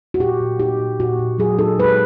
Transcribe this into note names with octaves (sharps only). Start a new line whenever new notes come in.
F#4
A#2 G4
A#2
D#4 G4
A#2
A#2 F#4
A#2
F#3 G#4
D#4 A4
G#3 B4